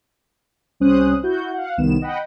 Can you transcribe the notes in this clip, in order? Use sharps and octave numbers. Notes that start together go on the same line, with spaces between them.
C2 G3 C#4 C5 D#6 F#6
E4 F#4 G6
F5 F#5
C2 D#3 B3 E7
D#5 F#5 G5 B5